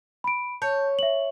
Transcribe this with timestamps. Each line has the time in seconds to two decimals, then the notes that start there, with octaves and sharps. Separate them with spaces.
0.24 B5 D7
0.62 C#5 A5 G6
0.99 E5 F#7